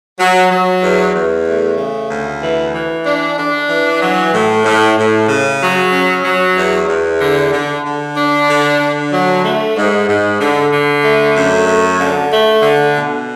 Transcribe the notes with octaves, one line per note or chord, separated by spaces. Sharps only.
F#3
F#3
E2
E2
A3
C#3
D2
E3
E3
D4
D4
E3
F#3
A2
A2
A2
C#3
F#3
C#4
F#3
E2
E2
D3
D3
D3
D4
D3
D3
F#3
A3
G#2
G#2
D3
D3
A3
F#2
A3
D3
A3
D3
B2